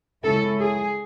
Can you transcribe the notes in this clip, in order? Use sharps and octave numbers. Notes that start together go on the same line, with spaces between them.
C#3 G#3 C#4 E4 A4
G#4